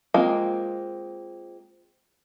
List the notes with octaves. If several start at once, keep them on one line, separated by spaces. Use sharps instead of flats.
G#3 A#3 C4 F4